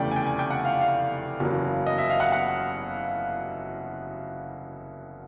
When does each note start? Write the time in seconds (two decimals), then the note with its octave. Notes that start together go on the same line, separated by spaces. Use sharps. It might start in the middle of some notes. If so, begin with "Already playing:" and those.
Already playing: F1 E2 C#3 E3 A3 D5 G5
0.11 G#5
0.16 G5
0.27 G#5
0.39 G5
0.50 F#5
0.65 F5
0.80 F5
1.40 F#1 E2 C#3 F#3 A#3
1.87 D#5
1.98 E5
2.10 F5
2.20 F#5
2.32 F#5